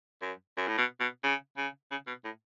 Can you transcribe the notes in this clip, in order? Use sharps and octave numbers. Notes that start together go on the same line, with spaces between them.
F#2
F#2
A2
B2
B2
C#3
C#3
C#3
B2
A2